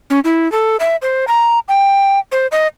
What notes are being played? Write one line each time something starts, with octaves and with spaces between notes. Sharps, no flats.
C#4
E4
A4
E5
C5
A#5
G5
C5
D#5